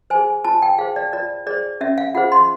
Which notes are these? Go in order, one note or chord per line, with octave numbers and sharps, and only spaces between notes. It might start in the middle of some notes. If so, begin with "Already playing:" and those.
G#4 C5 G#5
F4 A5
G5
G#4 C5 F5
D5
F4 D5
G#4 C5 D5
C#4 E5
F5
F4 G#4 C5 F#5
C6